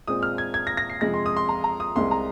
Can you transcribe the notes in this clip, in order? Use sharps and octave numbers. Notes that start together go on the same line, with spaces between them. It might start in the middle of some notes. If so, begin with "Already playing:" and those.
A#2 G#3 C4 D#6
F6
G#6
G#6
A#6
A#6
C7
F2 C3 G#3 A#6
C6
D#6
C6
A#5
A#5
D#6
C2 C3 G#3 C4 C6
A#5